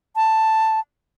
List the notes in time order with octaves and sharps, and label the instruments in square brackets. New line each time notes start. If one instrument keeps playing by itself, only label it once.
[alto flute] A5